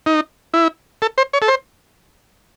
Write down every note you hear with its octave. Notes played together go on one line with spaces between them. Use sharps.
D#4
E4
A4
C5
C#5
A4
C5